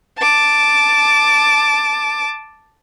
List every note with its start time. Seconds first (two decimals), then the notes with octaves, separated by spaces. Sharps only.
0.18 A5 D6